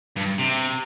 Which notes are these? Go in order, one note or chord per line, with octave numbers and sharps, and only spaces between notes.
G2
C3